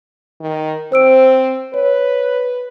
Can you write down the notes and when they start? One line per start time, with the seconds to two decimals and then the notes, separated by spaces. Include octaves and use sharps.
0.41 D#3
0.92 C4 C5 E6 D7
1.74 B4 C#5